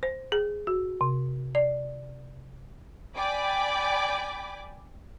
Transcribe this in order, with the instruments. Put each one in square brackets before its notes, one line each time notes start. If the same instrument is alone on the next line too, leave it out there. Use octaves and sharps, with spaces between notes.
[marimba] C5
G#4
F#4
C3
D5
[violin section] D5 G5 G#5 B5 D6